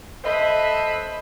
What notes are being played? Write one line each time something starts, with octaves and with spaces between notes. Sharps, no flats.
A4 B4 C5 D#5 E5 B5